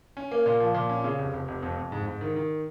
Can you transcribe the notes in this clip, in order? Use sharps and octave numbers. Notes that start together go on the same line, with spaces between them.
C#4
A#3
A#2
F3
A#2
C#4
C#3
F1
F1
F1
F2
F2
G#2
G#2
D#3
D#3